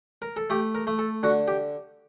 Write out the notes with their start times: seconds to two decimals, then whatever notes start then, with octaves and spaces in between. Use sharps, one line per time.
0.22 A#4
0.37 A4
0.50 A3 G4
0.75 A#4
0.87 A3
0.99 A4
1.23 D3 F#4
1.48 G4